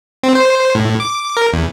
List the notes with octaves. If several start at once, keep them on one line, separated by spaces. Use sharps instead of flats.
C4
C5
A2
D6
A#4
E2